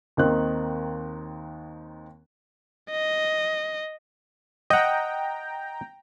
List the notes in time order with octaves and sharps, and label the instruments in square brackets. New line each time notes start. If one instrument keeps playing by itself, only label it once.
[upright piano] D#2 D#3 C4 D#4 F#6
[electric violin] D#5
[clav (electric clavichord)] D#5 F#5 [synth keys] G5 A#5